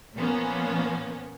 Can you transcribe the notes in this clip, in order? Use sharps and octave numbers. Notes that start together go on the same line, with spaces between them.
A#2 F3 A#3 B3 C#4